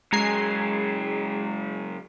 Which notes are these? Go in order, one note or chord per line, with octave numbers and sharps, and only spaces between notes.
C#3 F#3 G#3 G#4 A#5 G#6 C7